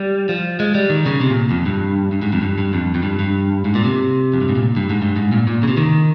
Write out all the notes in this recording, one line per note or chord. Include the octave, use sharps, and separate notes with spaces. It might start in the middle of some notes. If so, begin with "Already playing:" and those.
Already playing: G3
F3
G#3
G3
D#3
C#3
C3
A#2
F2
G2
G2
G#2
F2
G2
G2
F2
F2
G2
G2
G#2
A#2
C3
F2
G2
G#2
A#2
G2
G#2
G2
G#2
A#2
A#2
C#3
C3
D#3